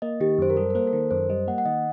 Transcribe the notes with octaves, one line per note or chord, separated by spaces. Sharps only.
A#3 D#5
D#3 G4
F#2 C5
A#4
G3 A4
A#4
A#3 C5
A4
D#3 A#4
F#2 C5
G3 D#5
A#3 F#5
F#5
D#3 D#5